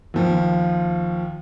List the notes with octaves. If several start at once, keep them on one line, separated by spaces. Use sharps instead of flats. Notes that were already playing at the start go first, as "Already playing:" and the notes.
D#2 F3